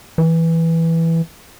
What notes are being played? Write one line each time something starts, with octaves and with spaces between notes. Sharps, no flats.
E3